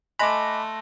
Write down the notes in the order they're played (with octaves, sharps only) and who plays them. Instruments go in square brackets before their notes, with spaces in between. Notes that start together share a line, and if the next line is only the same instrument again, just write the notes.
[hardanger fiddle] A3 [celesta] D#5 G#5 [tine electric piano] B5 D6 [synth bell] C6 F#6 A#6